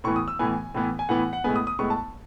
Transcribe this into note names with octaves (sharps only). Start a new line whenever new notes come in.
A2 E3 B3 C#6
D#6
E6
A2 E3 B3 G#5
A2 E3 B3
G#5
A2 E3 B3 F#5
F#5
A2 G#3 B3 G#5
D#6
D#6
A2 G#3 B3 C#6
A5